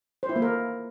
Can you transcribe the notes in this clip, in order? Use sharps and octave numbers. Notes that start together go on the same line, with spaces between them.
C5
E4
A#3
A#4